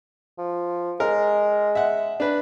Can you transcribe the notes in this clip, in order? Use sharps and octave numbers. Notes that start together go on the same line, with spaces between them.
F3
G#3 A#4
E5 F#5
D4 B4